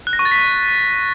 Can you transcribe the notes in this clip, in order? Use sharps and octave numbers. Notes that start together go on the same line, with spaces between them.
F#6
A#6
C#6
A6
B6